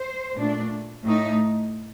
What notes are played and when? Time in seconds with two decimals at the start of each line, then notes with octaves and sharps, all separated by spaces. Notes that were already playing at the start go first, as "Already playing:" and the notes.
Already playing: C5
0.38 A#2 A3 D4
1.05 A2 A3 D#4